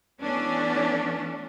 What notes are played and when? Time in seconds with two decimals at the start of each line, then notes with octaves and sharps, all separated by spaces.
0.21 E3 A3 B3 C#4 D4